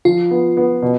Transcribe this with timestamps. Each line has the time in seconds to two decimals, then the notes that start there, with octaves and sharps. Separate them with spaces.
0.05 F3 F4
0.31 B3
0.57 B3
0.82 B2